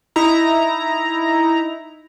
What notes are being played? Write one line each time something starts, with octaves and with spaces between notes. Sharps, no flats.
D#4 E4 A#5